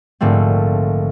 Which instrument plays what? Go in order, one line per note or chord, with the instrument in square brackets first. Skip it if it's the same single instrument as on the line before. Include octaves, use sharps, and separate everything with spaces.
[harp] A#1 G#2 D3 A3 C4